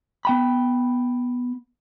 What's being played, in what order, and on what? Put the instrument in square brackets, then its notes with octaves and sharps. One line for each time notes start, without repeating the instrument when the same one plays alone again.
[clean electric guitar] B3 G5 B5